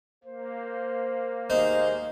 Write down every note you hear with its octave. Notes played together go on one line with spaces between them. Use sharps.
A#3 C5
D#2 G#3 D#4 C5